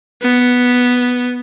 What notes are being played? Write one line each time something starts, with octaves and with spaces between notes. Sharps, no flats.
B3